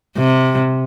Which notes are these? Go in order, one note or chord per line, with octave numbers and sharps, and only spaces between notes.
C3